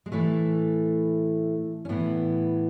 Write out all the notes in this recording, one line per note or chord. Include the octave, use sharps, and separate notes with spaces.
G#3
A2 E3 A3
C#4
A2 E3 B3